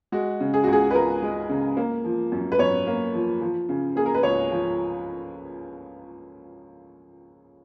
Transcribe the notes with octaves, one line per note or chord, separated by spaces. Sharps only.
G#3 F#4
C#3
G#4
C#2 F#4
G#4
B4
C#2 A#4
G#3
C#3
A#3
F3
F#2
B4
F#2 C#5
A#3
F3
F3
C#3
A#3 G#4
A#4
B4
C#2 C#5
F3